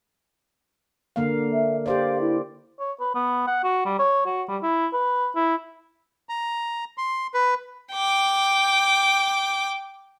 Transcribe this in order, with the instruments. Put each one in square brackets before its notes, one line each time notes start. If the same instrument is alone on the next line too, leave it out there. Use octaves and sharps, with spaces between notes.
[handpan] D3 A#3 F5
[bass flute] E5
[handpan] G4 C5 D5 [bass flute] F5
[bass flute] E4
[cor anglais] C#5
B4
B3
F#5
F#4
G3
C#5
F#4
G3
E4
B4
E4
[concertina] A#5
C6
B4
[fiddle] G5 D6